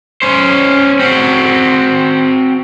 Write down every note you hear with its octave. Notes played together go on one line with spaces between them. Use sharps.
C#4 C5
C4 F#4